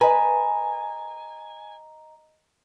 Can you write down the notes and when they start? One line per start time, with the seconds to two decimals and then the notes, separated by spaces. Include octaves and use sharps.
0.01 B4 D#5 G#5 A#5